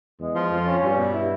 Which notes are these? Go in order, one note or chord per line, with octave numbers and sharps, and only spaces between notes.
E2 G#3
F3
F2 F4
C#4
G2 G3
B2
E4